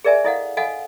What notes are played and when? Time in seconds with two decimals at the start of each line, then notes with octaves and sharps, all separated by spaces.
0.05 G#4 A#4 D5 E5 G#5
0.24 E4 A4 D#5 F5 F#5
0.57 A4 D#5 F5 F#5 G#5